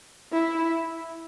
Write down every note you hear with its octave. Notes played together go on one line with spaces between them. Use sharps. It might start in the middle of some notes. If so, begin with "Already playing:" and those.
E4